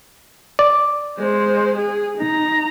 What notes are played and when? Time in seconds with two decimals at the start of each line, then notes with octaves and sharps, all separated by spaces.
0.59 D5
1.19 G#3 C5
1.76 G#4
2.18 D#4 A#5